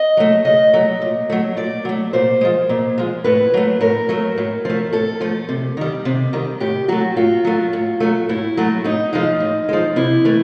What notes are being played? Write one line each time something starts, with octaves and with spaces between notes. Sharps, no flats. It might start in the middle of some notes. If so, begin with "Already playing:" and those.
Already playing: D#5
F#3 A3
C#3 D#5
F#3 A3
A#2
F#3 A3
A#2 D5
F#3 A3
A#2 C5
F3 G#3
A#2
F3 G#3
A2 B4
F#3 A3
A2 A#4
F#3 A3
A2
F3 A3
A2 A4
F3 A3
C3
D#3 G3
C3
D#3 G3
A2 G4
F#3 A3 F#4
A2 F4
F#3 A3
A2
F#3 A3
A2 E4
F#3 A3
A2 D#4
F3 G#3 D#4
A2
F3 G#3
C3 E4
E3 A3